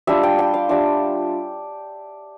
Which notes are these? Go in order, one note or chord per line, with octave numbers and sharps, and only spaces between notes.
G3 D4 F4 E5
G5
G5
F5
G3 D4 F4 E5